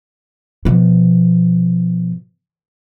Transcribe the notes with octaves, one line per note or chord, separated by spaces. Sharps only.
B2 F3